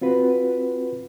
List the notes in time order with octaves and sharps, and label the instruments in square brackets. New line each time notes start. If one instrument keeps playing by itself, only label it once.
[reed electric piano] C4 F4 F#4 B4